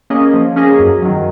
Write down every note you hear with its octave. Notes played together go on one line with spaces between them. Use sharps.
A#3 C#4 G#4 D#5
F3
A#3 C#4 G#4 D#5
F#2
D#3 F#3